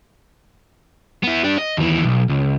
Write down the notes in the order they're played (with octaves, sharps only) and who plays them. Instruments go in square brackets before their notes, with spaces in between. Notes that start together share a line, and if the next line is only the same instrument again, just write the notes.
[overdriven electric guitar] B3 E4
D4 G4
D#5
D#2 E3
B1
C#2